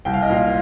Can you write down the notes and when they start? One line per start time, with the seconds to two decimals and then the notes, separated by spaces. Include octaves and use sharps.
0.05 C2 G5
0.14 F5
0.23 D#5
0.30 A#2 F4 F5